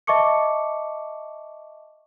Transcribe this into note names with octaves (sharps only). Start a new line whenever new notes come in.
D#5 E5 A5 C#6 D6 C#7